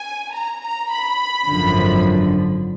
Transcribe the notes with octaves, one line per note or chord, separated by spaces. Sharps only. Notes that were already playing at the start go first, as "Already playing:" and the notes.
Already playing: G#5
A#5
A#5
B5
G#1 F#2 D3 F3